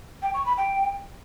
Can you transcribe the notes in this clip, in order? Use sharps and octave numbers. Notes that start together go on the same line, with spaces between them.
G5
C#6
B5
G5